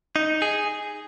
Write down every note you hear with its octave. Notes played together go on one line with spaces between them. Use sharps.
D#4
G#4